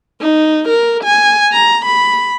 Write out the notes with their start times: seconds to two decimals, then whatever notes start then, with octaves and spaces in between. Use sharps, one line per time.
0.21 D#4
0.69 A#4
1.04 G#5
1.52 A#5
1.85 B5